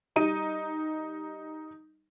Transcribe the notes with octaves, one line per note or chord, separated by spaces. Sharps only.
G3 D#4 D#7